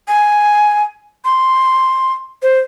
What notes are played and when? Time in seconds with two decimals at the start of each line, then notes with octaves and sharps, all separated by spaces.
0.08 G#5
1.25 C6
2.42 C5